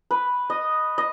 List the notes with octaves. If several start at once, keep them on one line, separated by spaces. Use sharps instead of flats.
B4
D#5
D#5